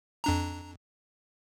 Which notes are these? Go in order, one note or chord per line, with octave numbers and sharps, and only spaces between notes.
F2 D4 A#5